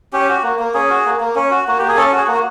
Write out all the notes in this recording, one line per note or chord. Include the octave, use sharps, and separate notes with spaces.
C#4 G4
F#4
A#3
A#3
C#4 G#4
F#4
A#3
A#3
C#4
F#4
A#3 F#4
A#3 G4
G#4
C#4 A4
F#4
G#4
A#3
F#4